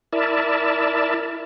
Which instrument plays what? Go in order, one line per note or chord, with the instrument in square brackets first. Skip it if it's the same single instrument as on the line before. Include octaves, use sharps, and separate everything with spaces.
[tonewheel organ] E4 A#4 D5 E5 A5